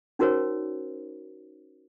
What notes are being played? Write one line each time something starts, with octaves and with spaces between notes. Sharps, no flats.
C#4 D#4 F#4 A#4 C5 C#5